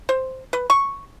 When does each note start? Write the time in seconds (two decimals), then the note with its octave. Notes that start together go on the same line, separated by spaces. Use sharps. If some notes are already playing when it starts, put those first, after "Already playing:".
0.09 C5
0.53 B4
0.70 C#6